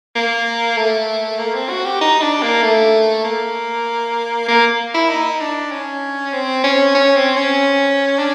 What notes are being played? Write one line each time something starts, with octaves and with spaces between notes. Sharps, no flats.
A#3
A3
A#3
C4
F#4
G4
D#4
D4
A#3
A3
A#3
A#3
E4
D#4
D4
C#4
C4
C#4
C#4
C4
C#4
D4